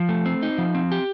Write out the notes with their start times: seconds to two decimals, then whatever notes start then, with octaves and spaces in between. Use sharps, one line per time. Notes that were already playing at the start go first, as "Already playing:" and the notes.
Already playing: F3
0.09 A3
0.26 C4
0.42 D#4
0.58 F3
0.75 C4
0.92 G4